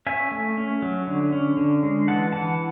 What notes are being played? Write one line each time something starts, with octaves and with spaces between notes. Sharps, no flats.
C#4 E5 G#5
A3
C#4
F#3
D3
C#4
D3
G#3
E3 F#5 A5
E3 F#5 A5